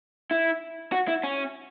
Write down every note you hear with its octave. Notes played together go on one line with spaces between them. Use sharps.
E4
F#4
E4
C#4